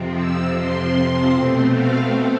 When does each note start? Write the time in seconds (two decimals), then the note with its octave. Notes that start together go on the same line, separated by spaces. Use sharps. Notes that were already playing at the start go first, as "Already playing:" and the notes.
Already playing: F2 C3 F3 C4
0.14 E6
0.53 C6
1.32 B2 A3 C4
1.72 F5